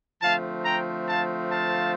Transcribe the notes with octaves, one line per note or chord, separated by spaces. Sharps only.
D3 F3 A3 C4 F5 A5
G5 A#5
F5 A5
F5 A5